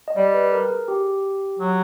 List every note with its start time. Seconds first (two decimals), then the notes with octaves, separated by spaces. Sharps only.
0.08 D#5
0.16 G3 D5
0.34 B4
0.52 A#4
0.70 G#4
0.88 G4
1.59 F#3